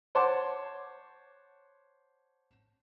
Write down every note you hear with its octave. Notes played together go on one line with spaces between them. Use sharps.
C5 C#5 F#5 A5 C6 D6